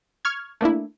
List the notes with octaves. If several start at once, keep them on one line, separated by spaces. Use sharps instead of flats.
C#6 F6 G#6
A3 A#3 D4 E4